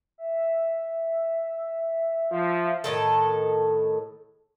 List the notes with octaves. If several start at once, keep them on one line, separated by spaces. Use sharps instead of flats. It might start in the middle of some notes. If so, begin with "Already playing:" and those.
E5
F3
A2 D#3 A4